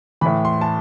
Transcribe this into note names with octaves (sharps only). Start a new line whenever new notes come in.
A2 E3 B5
C6
A5